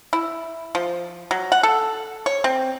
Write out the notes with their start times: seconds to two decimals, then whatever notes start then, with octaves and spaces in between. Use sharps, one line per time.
0.13 E4
0.75 F3
1.31 F#3
1.52 F#5
1.63 A4
2.26 C#5
2.44 C4